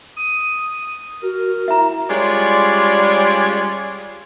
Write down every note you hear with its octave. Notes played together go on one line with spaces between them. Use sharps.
D#6
F#4 A#4
E4 E5 A#5
G3 G#3 C#4 F4 C#5 D5